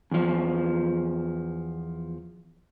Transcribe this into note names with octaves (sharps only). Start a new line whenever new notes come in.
E2 F3